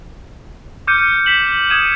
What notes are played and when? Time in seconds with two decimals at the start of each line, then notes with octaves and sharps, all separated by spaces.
0.87 D6 F6 G6 C#7 D#7
1.26 B6 E7 F#7
1.70 D#6 G6 G#6 C#7 D#7 E7